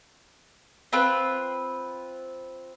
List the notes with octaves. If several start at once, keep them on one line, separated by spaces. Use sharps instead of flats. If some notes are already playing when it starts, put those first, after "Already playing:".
C4 F4 B4